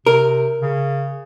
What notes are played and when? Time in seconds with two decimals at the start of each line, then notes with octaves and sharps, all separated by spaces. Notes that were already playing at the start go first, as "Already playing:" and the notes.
0.06 C3 A#4
0.62 C#3